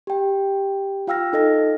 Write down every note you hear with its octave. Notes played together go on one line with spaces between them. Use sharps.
G4 G5
F4 F5 G5 E6 F6 A#6
D#4 A4 D#5 A#6